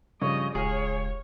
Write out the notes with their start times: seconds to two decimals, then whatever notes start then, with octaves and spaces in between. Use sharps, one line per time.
0.21 G2 C#3 F3 C#5 D#5
0.55 D#1 C#2 G#4 C#5 F6